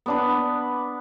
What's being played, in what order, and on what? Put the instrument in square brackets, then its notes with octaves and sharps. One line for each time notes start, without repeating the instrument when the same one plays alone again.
[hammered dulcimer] B3 D4 B4